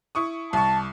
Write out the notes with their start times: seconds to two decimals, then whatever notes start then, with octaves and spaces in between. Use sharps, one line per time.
0.15 E4 C#6 D#6
0.53 C2 A5 C#6